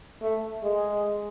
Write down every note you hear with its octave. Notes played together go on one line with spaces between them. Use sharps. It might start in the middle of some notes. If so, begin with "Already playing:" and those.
A3
G#3